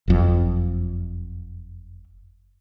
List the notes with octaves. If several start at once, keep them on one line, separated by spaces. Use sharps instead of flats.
F#1 F2